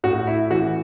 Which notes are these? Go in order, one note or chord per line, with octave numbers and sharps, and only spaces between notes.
A2 F#4
E4
E3 F#4